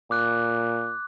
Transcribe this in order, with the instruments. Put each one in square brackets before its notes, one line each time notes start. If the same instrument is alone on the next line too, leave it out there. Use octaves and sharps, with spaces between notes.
[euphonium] A#2 [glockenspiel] D6 F#6